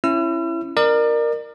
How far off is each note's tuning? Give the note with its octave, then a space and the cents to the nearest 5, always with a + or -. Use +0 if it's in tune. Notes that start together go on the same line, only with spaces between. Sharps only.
C#4 -15 E4 +20 E6 +45
A#4 +0 D5 +35